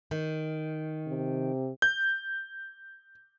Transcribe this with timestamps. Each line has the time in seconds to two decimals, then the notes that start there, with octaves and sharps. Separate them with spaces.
0.11 D#3
1.07 C3
1.82 G6